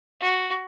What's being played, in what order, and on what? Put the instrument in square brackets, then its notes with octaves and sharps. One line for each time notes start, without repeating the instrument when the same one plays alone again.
[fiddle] F#4